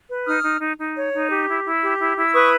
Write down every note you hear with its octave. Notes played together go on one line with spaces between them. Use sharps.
B4
D#4 D#6 F6
D#4
D#4
D#4
C#5
D#4
G4
E4
E4
G4
E4
E4
E6
B4 C#6 D#6